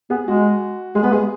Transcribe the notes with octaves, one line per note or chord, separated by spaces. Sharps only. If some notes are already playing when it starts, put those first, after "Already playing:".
B3 G#4
G#3 F#4
G#3 G#4
B3 B4
G#3 G#4